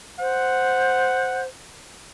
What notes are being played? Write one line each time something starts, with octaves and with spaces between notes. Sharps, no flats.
C5 F#5